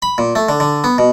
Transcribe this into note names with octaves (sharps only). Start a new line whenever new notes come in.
B5
A#2
A3
D3
D3
B3
B2